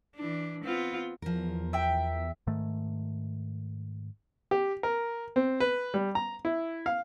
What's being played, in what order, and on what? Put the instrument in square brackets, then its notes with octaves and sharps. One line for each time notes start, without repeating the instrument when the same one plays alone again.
[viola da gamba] E3 D4
B3 C4 F4
[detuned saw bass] E2 [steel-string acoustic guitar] F3 A#4
[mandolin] E5 G5
[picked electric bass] G#2 D#3 A3
[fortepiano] G4
A#4
C4
B4
G3
A#5
E4
F5